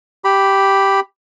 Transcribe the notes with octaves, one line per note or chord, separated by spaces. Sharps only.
G4 B5